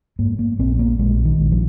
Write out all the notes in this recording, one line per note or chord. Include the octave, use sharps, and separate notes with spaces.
G#2 A#3
A#3
A#1 C4
A#3
A#1 G#3
D#3
A#1
F3